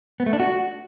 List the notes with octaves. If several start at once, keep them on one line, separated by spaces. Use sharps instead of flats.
B3
A3
D4
F#4